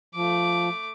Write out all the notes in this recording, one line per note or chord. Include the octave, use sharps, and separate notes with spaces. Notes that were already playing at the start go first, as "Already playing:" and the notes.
F3 A3 D6